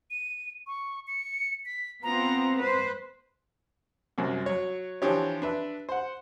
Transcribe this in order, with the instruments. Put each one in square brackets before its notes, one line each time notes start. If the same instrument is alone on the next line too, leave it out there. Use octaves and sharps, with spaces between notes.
[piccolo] D#7
C#6
C#7
B6
[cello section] B3 C4 F4 [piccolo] A#5
[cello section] B4 C5
[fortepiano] C2 F#2
F#3 C#5
E3 F3 D4 G4 C#5
D4 B4 E5
C5 F#5